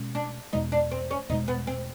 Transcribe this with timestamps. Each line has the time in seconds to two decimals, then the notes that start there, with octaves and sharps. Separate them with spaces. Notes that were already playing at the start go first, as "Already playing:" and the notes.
Already playing: B2 G#3 C#4
0.15 D4
0.53 E2 B2 G#3 D#4
0.72 D4
0.91 C4
1.11 C#4
1.29 E2 B2 G#3 D#4
1.48 B3
1.67 C4